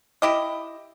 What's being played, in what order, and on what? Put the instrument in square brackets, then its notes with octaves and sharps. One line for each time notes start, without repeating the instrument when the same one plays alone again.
[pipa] E4 G4 D#5